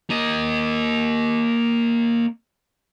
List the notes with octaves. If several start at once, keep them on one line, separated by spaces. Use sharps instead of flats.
A#3 D#5